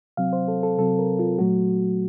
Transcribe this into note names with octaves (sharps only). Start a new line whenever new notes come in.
C3 F#3 C4 F5
C5
A4
A4
C3 F#3 C4 A4
A#4
F4
A#2 F#3 A3 F#4